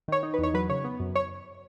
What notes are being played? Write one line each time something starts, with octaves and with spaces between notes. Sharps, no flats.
D#3 C#5
D#4
B4
E2 C#5
F#3 B4
C#3 C#5
B3
F#2
C#5